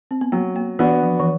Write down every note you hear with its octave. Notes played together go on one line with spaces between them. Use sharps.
C4
B3
F#3 A#3
A#3
E3 B3 D4 F#4
F3
E3